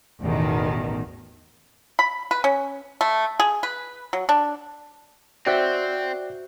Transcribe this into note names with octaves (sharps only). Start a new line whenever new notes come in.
A1 E2 B2 D#3
B5
B4
C#4
A3
G#4
B4
F#3
D4
C4 F#4 C5 D5 E5 G5 F#6